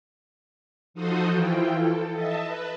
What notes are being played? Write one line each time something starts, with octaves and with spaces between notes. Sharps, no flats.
F3 D#4 F#4 A4 C5 D#5
E3 E4 F4 G5
A4
D#5 E5 A5
B4